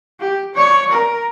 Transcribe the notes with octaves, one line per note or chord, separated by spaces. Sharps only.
G4
C#5 D5
A#4